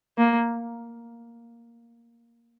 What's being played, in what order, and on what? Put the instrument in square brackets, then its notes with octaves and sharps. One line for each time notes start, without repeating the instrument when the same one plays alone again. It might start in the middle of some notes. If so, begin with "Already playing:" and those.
[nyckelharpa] A#3